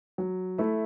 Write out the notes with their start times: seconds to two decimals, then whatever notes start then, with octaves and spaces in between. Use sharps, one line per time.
0.18 F#3
0.58 A3 E4